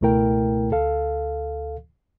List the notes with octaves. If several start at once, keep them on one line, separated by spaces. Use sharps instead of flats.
C#2 B2 A3 E4 A#4 G5
D2 A4 F5